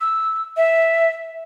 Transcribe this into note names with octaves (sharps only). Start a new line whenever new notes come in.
E6
E5